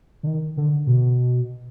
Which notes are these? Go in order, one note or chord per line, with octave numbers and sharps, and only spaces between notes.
D3
D#3
D3
B2